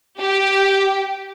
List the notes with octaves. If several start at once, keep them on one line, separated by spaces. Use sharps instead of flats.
G4